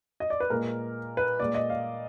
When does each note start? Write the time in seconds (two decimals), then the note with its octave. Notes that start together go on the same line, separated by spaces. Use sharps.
0.20 D#5
0.30 D5
0.40 B4
0.50 A#2 G#3 A#4
1.17 B4
1.40 A#2 G#3 D5
1.54 D#5
1.70 F5